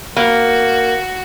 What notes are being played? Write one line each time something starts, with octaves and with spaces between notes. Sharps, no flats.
A#3 F#4